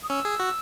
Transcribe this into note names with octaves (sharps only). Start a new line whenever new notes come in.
D#6
C#4 E6
G#4
F#4